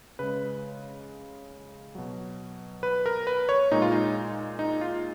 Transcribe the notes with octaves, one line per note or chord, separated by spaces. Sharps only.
C#3 G#3 B4
B2 F#3
B4
A#4
B4
C#5
A#2 G#3 D#4
F4
D#4
D#4
F4